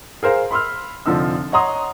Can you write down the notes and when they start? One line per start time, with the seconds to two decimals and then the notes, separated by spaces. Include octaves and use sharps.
0.23 G#4 A#4 C5 F5
0.51 B5 C6 E6 F6
1.06 F1 D3 F3 C4 D#4 E6
1.52 C#5 D#5 F#5 A#5 C6 D#6